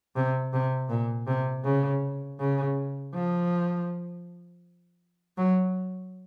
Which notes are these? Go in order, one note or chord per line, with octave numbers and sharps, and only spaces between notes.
C3
C3
A#2
C3
C#3
C#3
F3
F#3